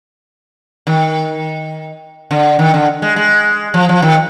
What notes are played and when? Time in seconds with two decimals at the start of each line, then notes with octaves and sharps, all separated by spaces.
0.87 D#3
2.31 D3
2.59 D#3
2.74 D3
3.02 G#3
3.16 G#3
3.74 F3
3.89 F3
4.02 D#3